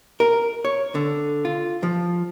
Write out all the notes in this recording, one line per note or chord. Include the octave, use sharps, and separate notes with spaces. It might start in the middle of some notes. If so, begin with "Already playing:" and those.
A#4
C#5
D3
F4
F3